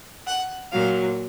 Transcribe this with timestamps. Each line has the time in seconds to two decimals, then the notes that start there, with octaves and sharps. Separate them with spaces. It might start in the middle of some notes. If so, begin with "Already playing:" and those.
0.27 F#5
0.72 A#2 F#3 F5